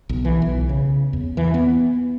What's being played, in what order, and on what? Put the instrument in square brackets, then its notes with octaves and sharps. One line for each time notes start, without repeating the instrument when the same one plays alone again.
[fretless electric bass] B1
E3
B1
C#3
E2
E3
B3